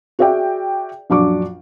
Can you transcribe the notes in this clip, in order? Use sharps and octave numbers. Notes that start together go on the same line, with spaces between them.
F#4 G#4 D5 E5 G5
A#1 F#2 D4 F#4 C#6 D6